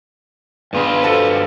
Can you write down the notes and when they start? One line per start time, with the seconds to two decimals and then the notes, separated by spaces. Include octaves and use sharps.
0.73 G2 B3 F4 G#4 B4
1.03 F#4 A4 C5